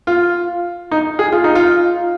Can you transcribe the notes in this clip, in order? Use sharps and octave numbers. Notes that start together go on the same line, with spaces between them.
F4
D#4
G#4
F4
D#4
F4